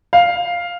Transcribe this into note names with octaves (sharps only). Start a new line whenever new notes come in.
F5